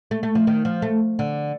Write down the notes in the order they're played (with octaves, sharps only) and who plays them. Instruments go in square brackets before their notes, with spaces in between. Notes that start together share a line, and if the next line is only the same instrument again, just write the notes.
[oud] A3
A3
F3
D#3
F3
A3
D3